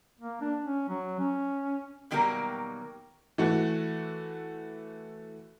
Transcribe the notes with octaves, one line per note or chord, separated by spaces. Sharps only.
A#3
D4
C#4
F#3
C#4
B2 D#3 F#3 G3 A#3 A#4
E3 A3 F#4